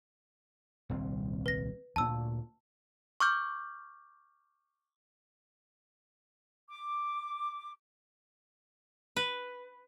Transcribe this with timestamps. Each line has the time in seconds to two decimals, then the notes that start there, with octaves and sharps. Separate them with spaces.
0.90 D#1 C2 C4
1.46 B4 A#6
1.96 D2 A#2 A5 E6
3.20 C#6 D6 F6 G6
6.69 D6
9.16 B4